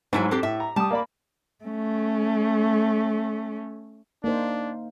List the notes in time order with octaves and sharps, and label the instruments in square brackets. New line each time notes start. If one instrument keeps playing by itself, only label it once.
[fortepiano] G#2 F#3 [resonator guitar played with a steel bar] A3 E4 G#5
[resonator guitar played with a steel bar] C4 D4 G4 [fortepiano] A4
[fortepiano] A2 [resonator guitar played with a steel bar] E5
[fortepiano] A#5
[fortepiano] G3 D#6 [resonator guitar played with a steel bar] A5
[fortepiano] A#3 D5 B5
[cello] A3 C#4
[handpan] A#3 D#4 C5 [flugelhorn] D4